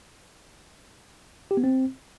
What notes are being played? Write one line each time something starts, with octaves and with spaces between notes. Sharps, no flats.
G4
B3
C4